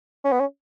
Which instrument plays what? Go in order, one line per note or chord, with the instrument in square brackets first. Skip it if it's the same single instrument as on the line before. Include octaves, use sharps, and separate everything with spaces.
[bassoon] C#4
B3
C#4